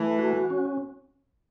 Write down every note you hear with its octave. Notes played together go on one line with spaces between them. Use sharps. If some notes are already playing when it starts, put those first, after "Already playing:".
Already playing: E3 A3
F#4
C#4